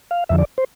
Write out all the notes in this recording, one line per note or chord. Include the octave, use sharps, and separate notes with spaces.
F5
F2 D3 F3 E5
D5
C5